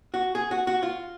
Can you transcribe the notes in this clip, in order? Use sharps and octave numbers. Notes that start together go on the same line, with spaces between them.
F#4
G#4
F#4
F#4
F4